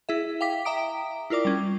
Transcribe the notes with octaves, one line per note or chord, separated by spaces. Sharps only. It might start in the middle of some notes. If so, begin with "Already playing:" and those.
E4 G#4 E5
F5 G5 D6 B6
E5 G5 A#5 D#6 D7
E4 F4 A#4 D5 D6
G3 C#4